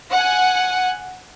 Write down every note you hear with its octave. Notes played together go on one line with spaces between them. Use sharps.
F#5 G#5